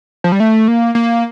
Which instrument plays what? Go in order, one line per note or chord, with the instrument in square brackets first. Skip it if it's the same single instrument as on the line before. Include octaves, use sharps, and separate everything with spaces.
[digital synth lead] F3
G3
A3
A#3
A#3